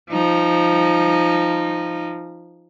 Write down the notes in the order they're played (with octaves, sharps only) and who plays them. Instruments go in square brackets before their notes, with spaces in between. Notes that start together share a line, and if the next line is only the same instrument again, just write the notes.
[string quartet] F3 D#4